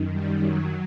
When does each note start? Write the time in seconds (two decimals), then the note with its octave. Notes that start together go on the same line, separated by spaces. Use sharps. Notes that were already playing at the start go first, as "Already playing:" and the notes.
Already playing: F#2 D#3
0.11 G3
0.42 F#3